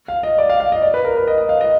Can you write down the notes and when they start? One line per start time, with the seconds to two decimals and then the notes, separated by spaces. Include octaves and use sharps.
0.08 F5
0.23 D#5
0.38 D5
0.49 F5
0.60 F5
0.72 D#5
0.82 D5
0.94 B4
1.05 A#4
1.17 B4
1.27 D#5
1.38 D#5
1.49 F5
1.61 D#5